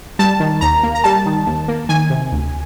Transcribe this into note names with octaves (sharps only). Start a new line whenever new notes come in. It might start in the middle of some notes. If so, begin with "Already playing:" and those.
G3 A5
D#3
D#2 A#5
A#3
A#5
G3 A5
D#3
D#2
A#3
D#3 G#5
C3
D2